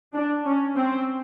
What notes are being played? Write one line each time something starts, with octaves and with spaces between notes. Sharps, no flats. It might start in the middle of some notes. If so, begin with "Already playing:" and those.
D4
C#4
C4